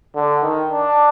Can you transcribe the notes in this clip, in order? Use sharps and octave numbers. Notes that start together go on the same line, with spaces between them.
D3
D#3
D4